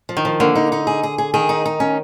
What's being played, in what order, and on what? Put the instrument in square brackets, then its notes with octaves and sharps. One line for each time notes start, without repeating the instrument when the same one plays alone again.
[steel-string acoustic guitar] F3
[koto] D#3
[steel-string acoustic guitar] F3
[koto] D3 [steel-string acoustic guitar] A#3
[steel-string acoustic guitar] D#4
D#4
G#4
G#4
G#4
[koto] D#3 [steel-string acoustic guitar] G#4
[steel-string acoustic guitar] D#4
D#4
C#4